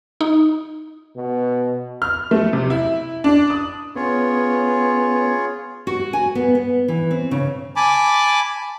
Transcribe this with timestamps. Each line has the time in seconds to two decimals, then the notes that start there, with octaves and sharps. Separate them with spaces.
0.21 D#4
1.16 B2
2.02 F6
2.31 A3
2.53 C3
2.70 E4
3.24 D4
3.50 D#6
3.96 B3 C#4 F4 G#4 C#5
5.87 F#4
6.13 G#5
6.35 B3
6.55 B3
6.88 E3
7.11 C4
7.31 C#3
7.76 G#5 A5 B5 D6